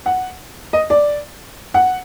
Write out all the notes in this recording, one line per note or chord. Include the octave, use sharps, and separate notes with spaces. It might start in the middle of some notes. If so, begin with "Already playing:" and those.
F#5
D#5
D5
F#5